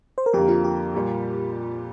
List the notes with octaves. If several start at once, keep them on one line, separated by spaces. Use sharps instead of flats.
C5
A#4
F2 D3 A#3 G4
F4
G4
A#2 G3